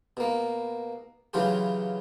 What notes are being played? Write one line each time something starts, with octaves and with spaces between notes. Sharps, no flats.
B2 A#3
C#3 E3 F#3 F4 G4